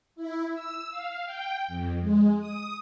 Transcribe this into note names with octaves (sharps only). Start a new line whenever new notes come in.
E4
E6
F5
G5
F2
G#3
D#6